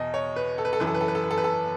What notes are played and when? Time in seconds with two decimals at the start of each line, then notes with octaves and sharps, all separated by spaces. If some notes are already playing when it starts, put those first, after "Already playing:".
Already playing: E2 B2 D#5
0.14 C#5
0.36 B4
0.58 A4
0.65 B4
0.73 A4
0.80 F#2 E3 B4
0.87 A4
0.95 B4
1.01 A4
1.08 B4
1.15 A4
1.23 B4
1.31 A4
1.38 B4
1.44 A4